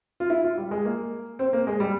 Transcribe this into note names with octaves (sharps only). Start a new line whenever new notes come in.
F4
E4
F4
G3
G#3
A#3
C4
A#3
G#3
G3